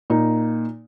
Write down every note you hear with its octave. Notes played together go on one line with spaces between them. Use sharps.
A#2 D#4